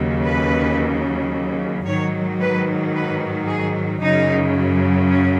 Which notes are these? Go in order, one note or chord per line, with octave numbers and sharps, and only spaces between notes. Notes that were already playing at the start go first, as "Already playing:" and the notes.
Already playing: D#2 C#3 F#3
B4
G#2 D#3 F#3 C#5
B4
B4
G#4
F#2 C#3 F#3 D#4
C#4